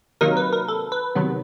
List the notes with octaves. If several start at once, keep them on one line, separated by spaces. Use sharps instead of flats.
C3 D#3 F#3 A#3 D#4 A#4
B4
A#4
A4
B4
C3 D#3 F#3 B3